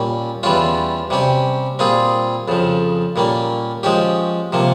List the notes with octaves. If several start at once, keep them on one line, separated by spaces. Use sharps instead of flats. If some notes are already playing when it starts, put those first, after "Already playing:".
Already playing: A#2 G3 C#4
E2 E3 G3 C#4 F4
C3 G3 C#4 G4
A#2 G3 C4 F4 G#4
F2 C#3 F3
A#2 G3 A#3 C#4
F3 G#3 C#4 G4
C3 F3 A#3